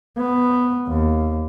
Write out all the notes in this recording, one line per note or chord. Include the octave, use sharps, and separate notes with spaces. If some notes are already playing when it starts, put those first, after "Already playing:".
B3
D#2